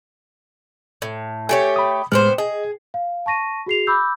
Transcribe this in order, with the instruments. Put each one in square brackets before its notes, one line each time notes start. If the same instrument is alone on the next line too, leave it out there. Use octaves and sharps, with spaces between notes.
[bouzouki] A2
[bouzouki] A3 G4 C#5 [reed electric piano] G#5
[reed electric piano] B5 D#6
[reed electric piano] A2 G#3 F6 [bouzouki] B3 G4 C5
[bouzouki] G#4 [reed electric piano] D#5
[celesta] F5
A5 C#6 A#6 D#7
F#4 G#4 C7 F7
B5 D6 E6 G6